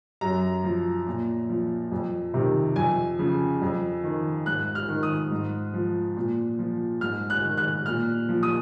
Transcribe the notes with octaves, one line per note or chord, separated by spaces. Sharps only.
F#2 A#5
F3
A#2
F3
F2
C3 D#3
F2 G#5
C#3 F3
F2
D#3
G#2 F#6
F6
D#3
D#6
G#2
F3
A#2
F3
G#2 F6
F#6
D#3
F#6
A#2 F6
F3
D#6